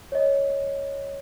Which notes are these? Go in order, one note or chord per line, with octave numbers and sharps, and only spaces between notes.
C#5 D#5